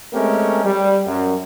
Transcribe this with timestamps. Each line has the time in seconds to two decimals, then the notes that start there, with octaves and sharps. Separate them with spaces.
0.14 G#3 A3 C4 C#4 G4 A#4
0.65 G3
1.07 F#2